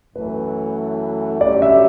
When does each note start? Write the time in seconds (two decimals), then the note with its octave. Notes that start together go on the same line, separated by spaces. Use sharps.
0.15 F#2 E3 A3 B4
1.41 F#2 D3 G3 C#4 G4 D5
1.62 E5